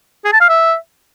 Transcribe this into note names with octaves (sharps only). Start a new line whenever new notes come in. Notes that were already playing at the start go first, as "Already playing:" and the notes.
G#4
A5
F5
E5